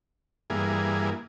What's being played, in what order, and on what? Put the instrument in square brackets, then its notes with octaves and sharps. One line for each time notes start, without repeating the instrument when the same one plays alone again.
[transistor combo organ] G2 E3 A#3 G#4